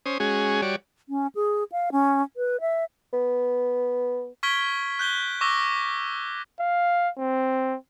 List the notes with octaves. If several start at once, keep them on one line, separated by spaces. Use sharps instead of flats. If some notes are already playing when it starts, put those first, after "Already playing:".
C#4 C5 D#6
G#3 C#4 F#4 G#4
G3 F#4 C#5 D5
C#4
G#4
F5
C#4
B4
E5
B3
C#6 F6 G#6 B6 D7 G7
F#6 G6 G7
C#6 D6 E6 A#6 G7
F5
C4